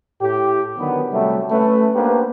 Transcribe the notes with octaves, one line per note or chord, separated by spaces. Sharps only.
A2 G4
D3 D#3 F#3 B3
C3 F#3 G3 A3
A3 C#4 B4
A#3 B3 D4 G4 B4 C5